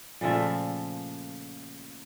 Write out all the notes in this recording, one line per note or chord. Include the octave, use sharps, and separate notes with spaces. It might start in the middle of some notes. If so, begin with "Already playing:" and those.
A#2 C#3 F3 A3